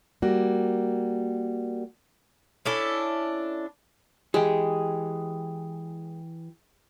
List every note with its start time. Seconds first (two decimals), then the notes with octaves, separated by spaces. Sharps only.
0.22 G3 A#3 F#4
2.66 C#4 D4 E4 A4
4.34 E3 G#3 G4